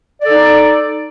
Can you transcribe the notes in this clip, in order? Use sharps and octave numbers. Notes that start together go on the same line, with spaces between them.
D#4 A4 D5